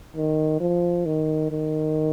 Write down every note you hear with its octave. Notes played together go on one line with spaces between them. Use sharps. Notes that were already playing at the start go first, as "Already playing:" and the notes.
D#3
F3
D#3
D#3